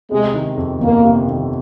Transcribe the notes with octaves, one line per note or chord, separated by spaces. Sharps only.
C3 G#3
D#3
F2
G1 A#3
C3
D#3